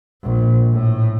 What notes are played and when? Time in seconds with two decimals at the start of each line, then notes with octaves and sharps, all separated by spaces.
0.23 A#1
0.73 A2